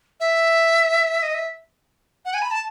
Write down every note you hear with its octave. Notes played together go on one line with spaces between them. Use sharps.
E5
D#5
E5
F#5
G#5
B5
A5